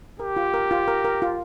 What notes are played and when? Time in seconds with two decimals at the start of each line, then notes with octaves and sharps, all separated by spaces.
0.20 G4 A#4
0.36 F4
0.54 A#4
0.71 F4
0.88 A#4
1.04 A#4
1.22 F4